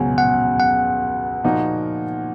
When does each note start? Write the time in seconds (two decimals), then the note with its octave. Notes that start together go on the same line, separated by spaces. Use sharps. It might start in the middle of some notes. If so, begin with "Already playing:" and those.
Already playing: C#2 B2 F#3 G#5
0.18 F#5
0.60 F#5
1.44 A#2 F3 A#3 D#4 F#4